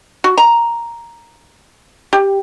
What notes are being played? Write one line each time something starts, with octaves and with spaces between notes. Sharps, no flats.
F#4
A#5
G4